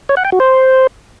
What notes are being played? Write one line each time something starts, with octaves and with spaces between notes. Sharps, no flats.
C#5
F#5
G5
F#4
C5